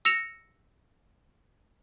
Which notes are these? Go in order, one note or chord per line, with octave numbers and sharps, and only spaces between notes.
E6 A#6 C#7 E7 F7